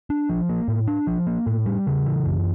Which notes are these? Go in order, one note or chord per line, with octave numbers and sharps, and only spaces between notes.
D4
F3
A#3
A2
D4
F3
A#3
A2
G3
C#3
E3
F#2